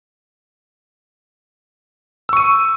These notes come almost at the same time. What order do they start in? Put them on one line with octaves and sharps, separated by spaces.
E6 C#6 D#7